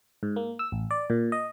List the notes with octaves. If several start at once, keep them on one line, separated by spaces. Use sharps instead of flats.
G#2
A#3
E6
A1
D5
A#2
D#5